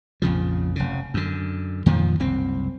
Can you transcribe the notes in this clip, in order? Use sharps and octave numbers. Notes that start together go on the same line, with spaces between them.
A#1 F2 C#3 F3
F1 C#3
F#2 D3
F2 A#2 D#3 F3
F#1 C2 C4